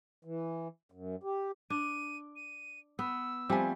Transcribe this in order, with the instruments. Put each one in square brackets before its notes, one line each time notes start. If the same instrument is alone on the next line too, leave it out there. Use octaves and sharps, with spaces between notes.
[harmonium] E3
F#2
G4
[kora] D4 [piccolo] D#7
[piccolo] D#7
[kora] B3 [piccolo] E6
[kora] F3 G3 A3 [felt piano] C4 G#5